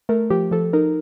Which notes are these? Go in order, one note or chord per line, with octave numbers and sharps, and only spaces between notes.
A3 A#4
F3 G4
F3 A4
D#4 A#4